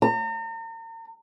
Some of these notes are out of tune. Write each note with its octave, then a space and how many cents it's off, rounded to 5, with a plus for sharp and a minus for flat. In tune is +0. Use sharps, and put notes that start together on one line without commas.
A#5 -40